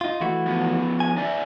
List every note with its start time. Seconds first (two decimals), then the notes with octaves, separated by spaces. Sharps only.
0.01 D#4 F4
0.21 E3 A3 F#4
0.46 F3 B3
1.00 G#5
1.17 D#4 D5 E5